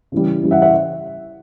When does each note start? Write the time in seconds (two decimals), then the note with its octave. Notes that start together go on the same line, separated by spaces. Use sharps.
0.12 C#3 E3 G3
0.42 C#3 E3 G3
0.51 E5 F#5
0.62 E5 F#5